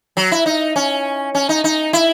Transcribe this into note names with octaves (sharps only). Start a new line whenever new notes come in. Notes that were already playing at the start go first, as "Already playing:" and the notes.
F#3
E4
D#4
C#4
C#4
D#4
D#4
E4